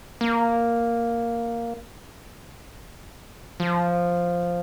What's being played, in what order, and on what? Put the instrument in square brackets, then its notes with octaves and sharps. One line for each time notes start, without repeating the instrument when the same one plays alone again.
[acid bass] A#3
F3